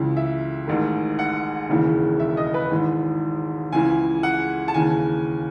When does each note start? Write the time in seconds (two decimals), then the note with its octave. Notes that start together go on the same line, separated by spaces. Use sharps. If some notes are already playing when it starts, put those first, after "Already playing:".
Already playing: C#2 C#3 E3
0.17 E5
0.67 A1 G#2 D#3
1.19 F#5
1.69 E1 D#2 C#3 E3
2.20 E5
2.37 D#5
2.54 B4
2.71 G#1 G#2 E3
3.72 C#2 C#3 E3 G#5
4.23 F#5
4.68 A5
4.74 D#2 C#3 E3 G#5